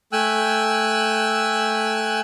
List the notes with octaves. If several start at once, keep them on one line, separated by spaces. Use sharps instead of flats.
A3 G5 G#5 E6 F#6